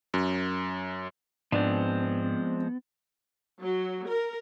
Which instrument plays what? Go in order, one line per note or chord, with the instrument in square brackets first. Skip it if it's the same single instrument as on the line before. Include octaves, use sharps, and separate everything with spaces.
[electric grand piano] F#2
[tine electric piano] G#2 [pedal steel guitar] F3 G#3 C4 [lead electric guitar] B3 [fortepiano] D4
[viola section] F#3
A#4